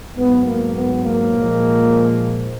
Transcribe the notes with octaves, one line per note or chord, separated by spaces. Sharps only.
G#2 F#3 B3
A#3
B3
A#3
A#2 F3 G#3